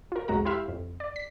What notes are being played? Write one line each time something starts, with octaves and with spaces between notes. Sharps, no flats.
F4 A#4
C2 F2 F#3 G#3 F#4 A#5
E4 G4 C5 E5 F5
F2
D5
B6